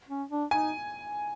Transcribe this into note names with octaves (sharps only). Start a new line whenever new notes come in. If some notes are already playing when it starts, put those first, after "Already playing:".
C#4
D4
D#4 G#5